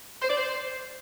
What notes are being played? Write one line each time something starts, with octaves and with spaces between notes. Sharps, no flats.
C5
D5
C5